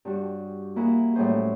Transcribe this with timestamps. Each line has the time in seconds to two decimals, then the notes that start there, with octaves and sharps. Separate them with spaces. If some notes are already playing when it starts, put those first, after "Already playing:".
0.05 G2 G3 F#4
0.76 A#3 E4 F#4 G#4
1.15 A2 F#3 G3 C#4 G#4 C5